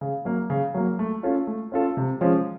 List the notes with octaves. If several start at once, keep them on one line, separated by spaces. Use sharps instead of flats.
C#3
F#3 A#3
C#3
F#3 A#3
A3
C#4 F4 A4
A3
C#4 F4 A4
C3
F3 G#3 C#4